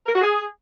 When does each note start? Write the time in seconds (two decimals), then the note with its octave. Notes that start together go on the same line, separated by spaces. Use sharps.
0.06 A#4
0.14 F#4
0.21 G#4